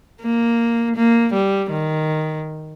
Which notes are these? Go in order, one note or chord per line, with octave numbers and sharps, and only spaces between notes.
A#3
A#3
G3
D#3